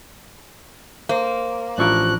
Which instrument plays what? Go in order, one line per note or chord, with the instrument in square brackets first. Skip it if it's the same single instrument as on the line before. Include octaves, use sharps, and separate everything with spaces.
[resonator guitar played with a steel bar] A#3 [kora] C5
[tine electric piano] A1 F3 C#6 [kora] D4 E4 A#4 [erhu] F#6